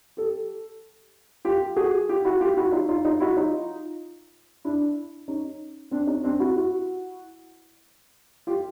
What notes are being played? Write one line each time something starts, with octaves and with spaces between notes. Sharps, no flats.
G4 A4
F4 G4
F#4 G#4
F4 G4
E4 F#4
F4 G4
E4 F#4
D#4 F4
D#4 F4
D#4 F4
E4 F#4
D#4 F4
D4 E4
C#4 D#4
C4 D4
C#4 D#4
C4 D4
E4 F#4
E4 F#4
F4 G4